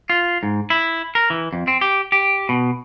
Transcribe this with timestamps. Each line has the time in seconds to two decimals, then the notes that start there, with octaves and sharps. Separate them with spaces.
0.10 F4
0.43 G#2
0.70 E4
1.15 A#4
1.30 E3
1.53 F2
1.68 C4
1.81 G4
2.12 G4
2.49 B2